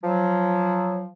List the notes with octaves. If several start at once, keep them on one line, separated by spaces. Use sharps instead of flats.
F3 F#3